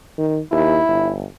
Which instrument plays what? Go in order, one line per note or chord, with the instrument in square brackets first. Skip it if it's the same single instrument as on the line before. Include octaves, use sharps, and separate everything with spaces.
[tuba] D#3
[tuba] D#2 [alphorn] E4
[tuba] G1